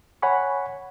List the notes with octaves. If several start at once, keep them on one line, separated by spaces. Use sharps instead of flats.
C#5 F#5 G#5 B5 C#6